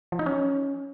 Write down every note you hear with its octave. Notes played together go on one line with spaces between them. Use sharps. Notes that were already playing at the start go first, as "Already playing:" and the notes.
F3
D#4
C#4